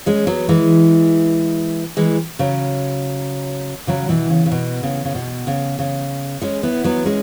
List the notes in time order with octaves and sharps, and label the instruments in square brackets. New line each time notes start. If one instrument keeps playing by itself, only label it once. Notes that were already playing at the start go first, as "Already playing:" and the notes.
[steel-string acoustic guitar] G#3 C#4
F#3 B3
E3 G#3
E3 G#3
C#3 F#3
C#3 F#3
B2 E3
C#3
C#3
B2
C#3
C#3
B2
C#3
C#3
G#3 C#4
B3 E4
F#3 B3
G#3 C#4